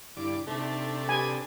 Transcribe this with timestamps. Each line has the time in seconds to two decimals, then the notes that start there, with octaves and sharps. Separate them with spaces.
0.17 G2 D3 E4 D6
0.47 C3 A3 D4 D#4 A4
1.09 G4 B4 G#5